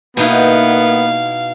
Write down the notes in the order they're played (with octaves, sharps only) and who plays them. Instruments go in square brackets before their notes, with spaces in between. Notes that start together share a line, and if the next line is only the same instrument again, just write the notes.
[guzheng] B2 D#4 E4 [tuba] A#3 [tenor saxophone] B3 [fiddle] F5